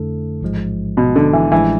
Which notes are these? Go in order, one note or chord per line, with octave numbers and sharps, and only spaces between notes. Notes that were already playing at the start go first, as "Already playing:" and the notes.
Already playing: F2 D3 A3 E4 A4
A1 G#2 F3 G#3
B2
D3
E3
A1 A2 E3 F3 G#3 D4